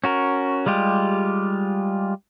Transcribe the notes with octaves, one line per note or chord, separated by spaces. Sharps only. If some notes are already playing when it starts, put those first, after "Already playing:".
C#4 F#4 A#4
G3 G#3 F4 G4